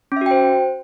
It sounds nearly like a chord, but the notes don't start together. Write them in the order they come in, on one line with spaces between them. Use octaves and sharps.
C#4 E5 F#4 G5 C5